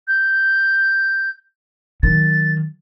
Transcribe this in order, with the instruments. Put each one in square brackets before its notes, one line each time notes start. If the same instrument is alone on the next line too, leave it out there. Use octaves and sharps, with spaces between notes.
[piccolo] G6
[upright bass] D#3 F#3 [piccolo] A6